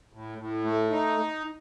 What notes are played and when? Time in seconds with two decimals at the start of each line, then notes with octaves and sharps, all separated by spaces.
0.13 A2
0.38 A2
0.64 A3
0.90 D#4